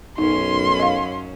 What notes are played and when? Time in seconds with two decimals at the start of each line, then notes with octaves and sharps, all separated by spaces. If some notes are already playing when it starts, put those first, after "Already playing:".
0.18 B1 F#2 C#4 D#4 C6
0.79 D#5 F5